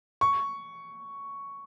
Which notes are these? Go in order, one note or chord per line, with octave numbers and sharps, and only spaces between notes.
C#6